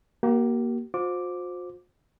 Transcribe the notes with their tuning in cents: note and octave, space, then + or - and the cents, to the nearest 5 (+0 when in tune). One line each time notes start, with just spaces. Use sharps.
A#3 +15 G4 -45
F4 +45 C5 +0 D6 +0